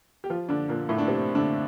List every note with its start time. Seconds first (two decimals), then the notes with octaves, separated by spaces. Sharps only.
0.24 G4
0.30 F3 F4
0.49 D3 D4
0.69 A#2 A#3
0.89 A2 A3
0.98 D4
1.08 C3 C4
1.35 D3 D4